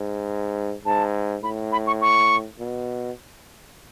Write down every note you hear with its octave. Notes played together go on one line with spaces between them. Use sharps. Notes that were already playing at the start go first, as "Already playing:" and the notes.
Already playing: G#2
G#2 A5
A2 B5
B5
C#6
C#6
B2